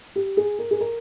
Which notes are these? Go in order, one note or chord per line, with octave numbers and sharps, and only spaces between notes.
G4
G#4
A#4
G#4
A#4